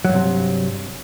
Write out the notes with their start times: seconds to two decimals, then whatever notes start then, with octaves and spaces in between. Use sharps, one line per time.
0.05 F#3
0.09 G2
0.14 C3